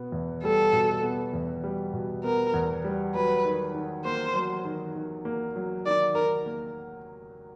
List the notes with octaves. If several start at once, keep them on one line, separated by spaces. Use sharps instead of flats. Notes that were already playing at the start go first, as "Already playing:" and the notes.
Already playing: B2 B3
E2
G3 A4
B2
B3
E2
G3
B2
B3 A#4
E2
G3
F#3 B4
D#3
D#3
A#3 C5
F#3
D#3
D#3
A#3
F#3
D#3 D5
D#3 A#4
A#3